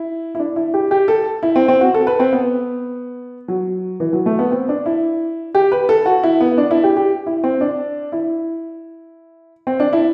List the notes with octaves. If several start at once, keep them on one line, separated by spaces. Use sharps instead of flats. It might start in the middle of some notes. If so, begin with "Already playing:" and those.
Already playing: E4
E4
D4
E4
G4
G4
A4
E4
C4
C4
F#4
A4
B4
C4
B3
F#3
E3
F#3
A3
B3
C4
D4
E4
G4
B4
A4
F#4
E4
B3
D4
E4
G4
G4
E4
C4
D4
E4
C4
D4
E4